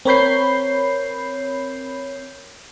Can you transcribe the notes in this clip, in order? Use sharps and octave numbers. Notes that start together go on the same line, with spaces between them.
C4 A#4 C#5 B5 G6 C7